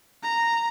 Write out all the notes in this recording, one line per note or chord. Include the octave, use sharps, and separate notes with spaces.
A#5